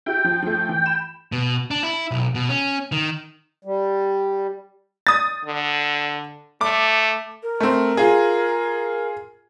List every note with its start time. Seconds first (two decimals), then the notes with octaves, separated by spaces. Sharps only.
0.06 E4 F#4 G4 G5
0.24 F3
0.42 F3 A3
0.69 E3
0.86 B5 E7
1.32 B2
1.71 D4
1.83 E4
2.11 B1
2.35 B2
2.49 C#4
2.92 D#3
3.65 G3
5.07 D#6 A6
5.45 D3
6.61 A3 D6
7.43 A#4
7.60 A3 C4
7.97 F4 G#4